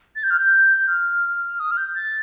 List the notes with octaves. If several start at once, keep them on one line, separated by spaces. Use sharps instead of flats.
A6
G6
F6
G6
F6
D#6
F6
G6
A6